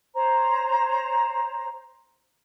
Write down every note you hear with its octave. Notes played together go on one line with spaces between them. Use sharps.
C5 C#5 A#5